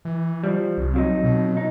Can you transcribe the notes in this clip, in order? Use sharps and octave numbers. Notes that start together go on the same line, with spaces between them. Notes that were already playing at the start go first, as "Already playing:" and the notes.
E3
F3 G3
C2
F2 F#3 D#4
B2
D#4